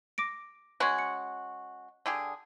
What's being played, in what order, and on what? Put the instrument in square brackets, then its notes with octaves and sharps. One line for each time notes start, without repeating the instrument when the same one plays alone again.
[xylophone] D6 A#6 D7
[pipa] G#3 C#4 F#4 [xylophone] C#6 G#6
[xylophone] C#7
[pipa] D3 G4 G#4